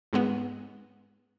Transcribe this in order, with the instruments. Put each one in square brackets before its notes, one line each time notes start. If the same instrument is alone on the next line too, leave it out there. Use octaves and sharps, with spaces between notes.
[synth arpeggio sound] G#2 G#3 B3